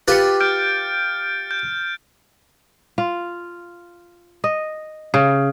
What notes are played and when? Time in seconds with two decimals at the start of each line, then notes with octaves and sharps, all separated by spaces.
0.08 F4 G4 B4 A6 C#7
0.40 F6 G6 D7
1.51 G6
2.98 F4
4.44 D#5
5.14 C#3